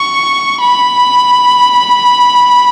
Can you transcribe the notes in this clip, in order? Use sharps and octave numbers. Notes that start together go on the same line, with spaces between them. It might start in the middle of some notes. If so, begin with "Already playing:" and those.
Already playing: C#6
B5